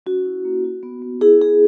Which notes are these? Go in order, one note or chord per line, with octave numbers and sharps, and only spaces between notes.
C#4 F#4
E4
A#3
F#4
B3
B3
E4 G#4
E4 G#4